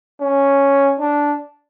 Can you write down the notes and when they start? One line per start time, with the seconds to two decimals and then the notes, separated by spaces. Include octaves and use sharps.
0.21 C#4
1.00 D4